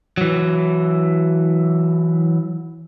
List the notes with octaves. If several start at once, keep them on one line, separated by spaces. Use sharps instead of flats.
E3 F#3